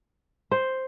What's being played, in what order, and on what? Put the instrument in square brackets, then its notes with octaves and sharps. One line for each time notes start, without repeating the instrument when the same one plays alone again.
[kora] C5